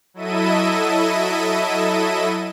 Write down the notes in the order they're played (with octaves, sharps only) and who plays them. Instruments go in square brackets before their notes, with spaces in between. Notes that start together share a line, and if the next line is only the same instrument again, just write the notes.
[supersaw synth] F#3 E4 A4 D#5 E5 D#7